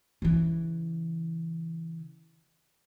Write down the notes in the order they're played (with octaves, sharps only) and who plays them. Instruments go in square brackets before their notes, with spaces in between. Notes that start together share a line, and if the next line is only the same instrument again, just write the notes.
[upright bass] C#3 E3